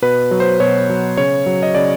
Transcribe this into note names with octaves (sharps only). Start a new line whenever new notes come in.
B2 B4
F#3
C5
B2 C#5
F#3
C#3 C#5
F#3
D#5
C#3 D5